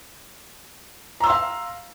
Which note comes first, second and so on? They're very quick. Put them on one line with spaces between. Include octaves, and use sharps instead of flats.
A#5 E6 C6 F5